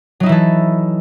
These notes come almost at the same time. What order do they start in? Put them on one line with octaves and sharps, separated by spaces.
F#3 D#4 E4 E3 A4